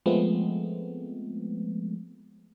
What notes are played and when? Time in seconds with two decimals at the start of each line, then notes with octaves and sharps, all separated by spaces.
0.06 F3 G#3 A3 B3 C4